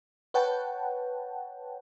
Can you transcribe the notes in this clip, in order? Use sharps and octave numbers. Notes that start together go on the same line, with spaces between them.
B4 C#5 F#5 G5 A5